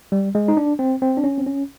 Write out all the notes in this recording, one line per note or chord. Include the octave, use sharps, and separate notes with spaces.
G3
G#3
D#4
D4
C4
C4
D4
C#4
C4
C#4